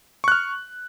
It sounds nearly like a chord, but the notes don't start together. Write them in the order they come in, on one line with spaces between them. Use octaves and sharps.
C#6 F#6 F6